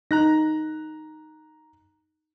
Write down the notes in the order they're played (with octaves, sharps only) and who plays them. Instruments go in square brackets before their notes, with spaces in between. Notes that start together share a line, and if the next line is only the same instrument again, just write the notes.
[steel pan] D#4 [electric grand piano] A#5 F#6 A#6